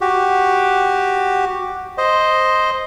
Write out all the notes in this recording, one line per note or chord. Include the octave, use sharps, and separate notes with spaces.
F#4 G4
C5 D#5